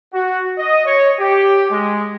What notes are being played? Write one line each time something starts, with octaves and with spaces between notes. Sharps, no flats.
F#4
D#5
C#5
G4
G#3